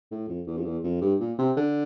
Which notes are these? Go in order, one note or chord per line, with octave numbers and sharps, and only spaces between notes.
A2
F2
E2
F2
E2
F2
G2
A#2
C3
D3